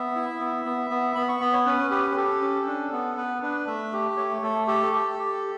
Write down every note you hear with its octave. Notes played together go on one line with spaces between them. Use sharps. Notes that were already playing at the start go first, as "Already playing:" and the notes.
Already playing: B3 E5
E4
B3
B3
B3
B3 B5
C#6
B3 B5
C#5
C#4 B4
G4 B4
B4
G4 A4
C#4
D4
B3
B3 B4
D4 B4
A3 E5
G4
A3 C#5
A3 A4
G4 A4
G4
G4